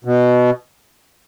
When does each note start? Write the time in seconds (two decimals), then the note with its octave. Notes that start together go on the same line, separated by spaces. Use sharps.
0.05 B2